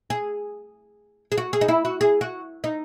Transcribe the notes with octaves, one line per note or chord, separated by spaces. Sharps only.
G#4
G#4
F#4
G#4
D#4
E4
F#4
G#4
F#4
D#4